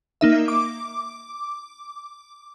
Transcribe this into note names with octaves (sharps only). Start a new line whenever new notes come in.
A#3 D#4 E5
D6